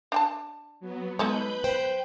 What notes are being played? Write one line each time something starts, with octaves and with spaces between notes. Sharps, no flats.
D4 G5 A5
F#3 B3
G#3 D#4 A4 B4 C#5 B5 G6
C5 G5